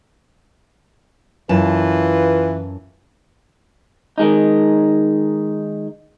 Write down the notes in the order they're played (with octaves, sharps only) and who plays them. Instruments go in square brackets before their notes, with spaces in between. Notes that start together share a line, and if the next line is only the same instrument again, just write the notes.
[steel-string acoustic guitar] F#2 A5 [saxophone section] E3 F4 B4
[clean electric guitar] D#3 G#3 D#4